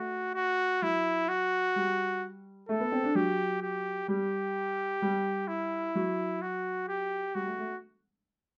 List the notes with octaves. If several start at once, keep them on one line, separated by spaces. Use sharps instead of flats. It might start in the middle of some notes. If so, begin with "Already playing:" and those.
Already playing: A3 F#4
F#4
F#3 E4
F#4
G3
A3 A4
B3
C4
D4
F#3 G4
G4
G3 G4
G3
E4
F#3
F#4
G4
G3 F#4
A3
A3